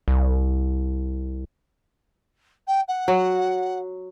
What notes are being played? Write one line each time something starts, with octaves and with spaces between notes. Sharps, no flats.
C2
G5
F#5
F#3